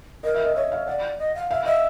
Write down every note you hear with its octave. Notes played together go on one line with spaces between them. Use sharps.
A#4 D#5
E5
D#5
C#5 E5
F5
D5 F#5
D#5
F5
E5 F5
D#5 E5